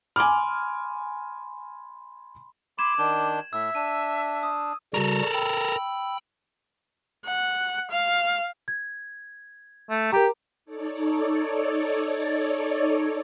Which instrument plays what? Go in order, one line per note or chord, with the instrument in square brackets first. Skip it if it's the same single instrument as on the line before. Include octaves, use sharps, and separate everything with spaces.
[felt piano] G#5 D6 F6 [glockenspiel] B5 C6
[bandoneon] B5 C6 [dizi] D6 [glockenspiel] G#6 E7 F#7
[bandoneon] D#3 D4 G6 [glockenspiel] E7
[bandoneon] A2 [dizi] E5 [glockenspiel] E6
[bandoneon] D4 [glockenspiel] D#7
[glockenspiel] D#6
[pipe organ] C#3 G3 F#4 [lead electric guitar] A4 A#4
[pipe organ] G5 B5 E6
[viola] F#5
F5
[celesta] G#6
[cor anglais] A3
[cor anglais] G4 [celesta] A#4 A#5
[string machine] D#4 A4 C#5 D5